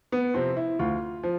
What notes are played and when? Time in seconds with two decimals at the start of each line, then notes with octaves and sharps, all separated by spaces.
0.12 B3
0.34 C3 F3 C4
0.57 E4
0.79 D2 F4
1.24 F3